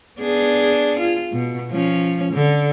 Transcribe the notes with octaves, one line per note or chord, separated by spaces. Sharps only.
B3 D4 G#4
F4
B2
F3 C#4
D3